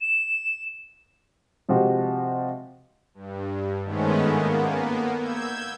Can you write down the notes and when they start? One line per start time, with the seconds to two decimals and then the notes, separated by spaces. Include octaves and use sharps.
0.01 E7
1.69 C3 F3 G#3 F#4 G4
3.14 G2
3.85 G#2 D#3 G#3 A3 B3 C#4
4.26 A#3 B3
5.19 E6 G6 G#6